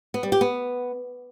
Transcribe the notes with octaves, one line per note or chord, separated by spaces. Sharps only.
B3
G3
G4
B3